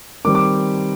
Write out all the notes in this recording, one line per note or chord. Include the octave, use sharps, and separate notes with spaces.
D#3 G3 C4 D6
D6